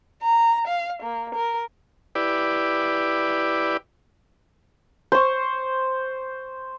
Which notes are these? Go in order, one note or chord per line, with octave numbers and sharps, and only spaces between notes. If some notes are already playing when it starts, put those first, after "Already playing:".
A#5
F5
A#3
A#4
E4 G4 B4 D5
C5 C#6